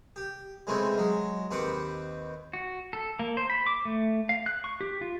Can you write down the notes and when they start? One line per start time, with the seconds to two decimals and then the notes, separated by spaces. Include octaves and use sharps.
0.16 G4
0.67 C#3 E3 G#3 A3 C4 C#4
0.98 F#3 G#3
1.51 D#2 C4 B4 F#5 C6 D6
2.53 F#4
2.93 A4
3.19 A#3
3.37 C5
3.50 B5
3.67 D6
3.85 A3
4.29 F5
4.46 F#6
4.64 C#6
4.81 G4
5.01 F4